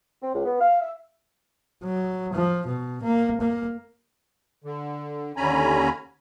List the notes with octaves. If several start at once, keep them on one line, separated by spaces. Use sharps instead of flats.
C4
C#2
B3
F5
E5
F#3
F3
B2
A#3
A#3
D3
D#2 D3 C#4 G#5 A#5 B5